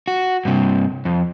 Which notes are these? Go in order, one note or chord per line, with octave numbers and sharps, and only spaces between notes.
F#4
G2 C3
F2